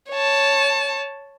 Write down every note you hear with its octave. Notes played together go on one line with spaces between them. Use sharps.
C#5 A5